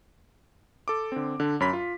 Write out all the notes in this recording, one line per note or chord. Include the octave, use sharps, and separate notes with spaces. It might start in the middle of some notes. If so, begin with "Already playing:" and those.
A4 D6
D3 C4
D3 D4
F#2 C#5 B5 B6
F4